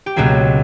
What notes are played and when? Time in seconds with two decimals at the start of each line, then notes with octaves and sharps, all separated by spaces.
0.06 G4
0.16 C#2 B2 F#3 A#3 F#4